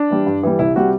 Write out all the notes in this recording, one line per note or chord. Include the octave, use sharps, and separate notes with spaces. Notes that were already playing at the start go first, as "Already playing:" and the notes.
Already playing: D4
E3 G3
G2
E3 G3
C2 E4
C3 G3 F#4